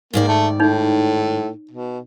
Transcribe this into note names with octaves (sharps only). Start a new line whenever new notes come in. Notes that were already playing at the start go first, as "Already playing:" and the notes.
G#2 D#3 A#3 D5
A3
A2 D#4 C#5
B2